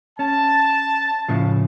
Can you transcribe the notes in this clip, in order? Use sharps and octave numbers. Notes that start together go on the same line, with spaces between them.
C#4 A5
A2 C#3 F3